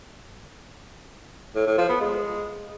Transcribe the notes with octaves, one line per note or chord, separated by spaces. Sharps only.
A2
A2
F3
B3
G#3